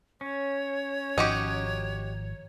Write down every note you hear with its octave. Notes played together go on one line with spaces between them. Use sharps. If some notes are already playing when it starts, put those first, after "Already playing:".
C#4 C#5
G#1 F3 D#4 F#4 G4